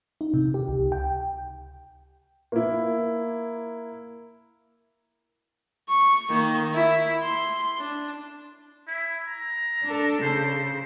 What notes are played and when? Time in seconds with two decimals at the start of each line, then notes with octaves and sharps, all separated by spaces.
0.21 D#4
0.34 C3
0.54 G4
0.68 C#2
0.92 G5
2.52 A#3 E4
5.89 C#6
6.29 D#3 A#3
6.74 E4
7.23 C6
7.79 D4
8.88 E4
9.27 A#5
9.84 D4 A4
10.22 C#3 C5